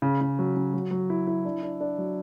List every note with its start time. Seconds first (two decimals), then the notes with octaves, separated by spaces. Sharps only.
0.02 C#3
0.21 C#3
0.39 F#3
0.56 C#3
0.74 F#3
0.91 F#3
1.10 E4
1.27 E4
1.45 D4
1.63 D4
1.80 D4
1.98 F#3